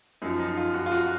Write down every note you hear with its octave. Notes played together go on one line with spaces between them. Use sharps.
F#2 F3 D#4
D#4
F4
F#4
F4
F#4